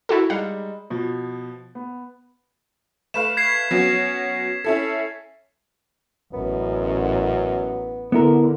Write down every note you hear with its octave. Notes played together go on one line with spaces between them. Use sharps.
E4 F#4 A4
G3 G#3 D#4 F5 F#5
B2 F3
B3
A3 B4 F5 E7
G#6 B6 C7
F#3 B3 C#4
C#4 E4 A4
A1 F#2 B3
D3 B3 E4 A#4